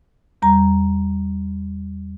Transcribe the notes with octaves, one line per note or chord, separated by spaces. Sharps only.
E2 G3 A#5